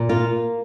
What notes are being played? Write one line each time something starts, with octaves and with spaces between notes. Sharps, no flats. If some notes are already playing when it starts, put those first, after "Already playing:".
Already playing: A#2
A#3 F4